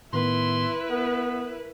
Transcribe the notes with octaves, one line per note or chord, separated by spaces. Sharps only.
A2 D#3 B3 E4 B4 C6
B3 A#4